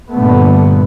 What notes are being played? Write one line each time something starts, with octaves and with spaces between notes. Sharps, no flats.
G2 A#2 D3 A3 B3